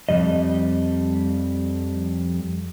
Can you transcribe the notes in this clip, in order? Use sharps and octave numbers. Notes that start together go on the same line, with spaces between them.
F2 C#3 G3 D#5